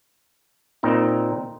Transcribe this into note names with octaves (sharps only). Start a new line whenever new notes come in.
A#2 C4 D#4 D#5